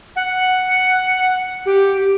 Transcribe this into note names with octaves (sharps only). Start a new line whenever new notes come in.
F#5
G4